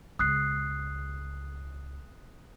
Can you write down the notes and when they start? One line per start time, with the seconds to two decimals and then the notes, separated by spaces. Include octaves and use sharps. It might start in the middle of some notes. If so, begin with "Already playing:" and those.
0.19 C#2 G#3 D#6 F#6 C7